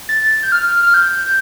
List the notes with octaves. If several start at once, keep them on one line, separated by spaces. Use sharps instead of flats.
A6
G6
F6
F6
G6